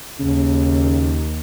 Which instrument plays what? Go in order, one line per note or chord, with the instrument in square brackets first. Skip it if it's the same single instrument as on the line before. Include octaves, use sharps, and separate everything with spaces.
[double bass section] D#2 [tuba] C#3